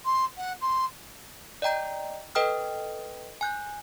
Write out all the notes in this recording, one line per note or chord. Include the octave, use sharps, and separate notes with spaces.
C6
F#5
C6
D5 D#5 G5 A#5 G6
A4 B4 D#5 G5 D#6 F6
G#5 F#6 G6